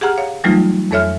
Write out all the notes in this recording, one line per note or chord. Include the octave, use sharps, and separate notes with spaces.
G4 G#4 F#5 A#5 F6
C#5 F5
E3 F#3 G3 A3 D#4 F4
F2 G#3 A4 C#5 E5 F6